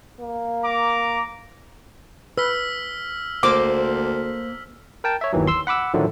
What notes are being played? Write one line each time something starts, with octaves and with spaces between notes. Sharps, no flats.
A#3
A#5 D6
B4 E6 F6 B6
D2 A#3 C5 D6
A#4 G5 A5
C#5 E5
G1 D#2 D#3 E3 F#3
C6 E6
F#5 B5 D6 E6
A2 D3 D#3 F3 F#3 A3